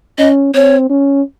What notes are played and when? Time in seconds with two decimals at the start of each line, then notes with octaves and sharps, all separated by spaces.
0.18 C#4 D#5
0.54 C4 C#5
0.90 C#4